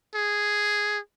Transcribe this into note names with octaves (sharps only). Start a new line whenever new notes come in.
G#4